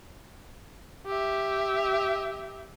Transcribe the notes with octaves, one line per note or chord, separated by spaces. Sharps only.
G4 E5